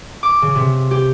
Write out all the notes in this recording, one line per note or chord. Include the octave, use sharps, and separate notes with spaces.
D6
C#3
C3
G4